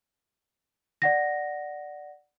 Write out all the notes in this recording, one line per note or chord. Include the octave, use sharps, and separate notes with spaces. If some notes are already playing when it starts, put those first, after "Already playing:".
D5 F#5 A#6